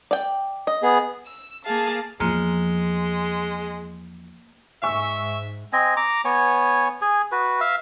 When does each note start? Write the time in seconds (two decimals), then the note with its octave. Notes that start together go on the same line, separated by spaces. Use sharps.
0.11 D5 G5
0.67 D#5
0.83 B3 G#4
1.27 E6
1.65 A#3 G#4 F5 A5
2.20 E2 F3 G#3 A#3 A#5 F6
4.83 G#2 E5 G#5 C#6 E6
5.73 C4 D#5 G#5
5.97 A#5 D6
6.25 B3 C#5 G#5
7.02 G#4 G#5
7.32 F#4 B4
7.60 E5 F5